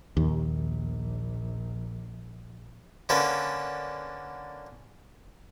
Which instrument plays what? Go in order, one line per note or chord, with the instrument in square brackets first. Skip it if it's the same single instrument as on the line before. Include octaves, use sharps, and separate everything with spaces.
[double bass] A#1 [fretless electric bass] D#2
[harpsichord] D3 A#3 C#4 A4 B4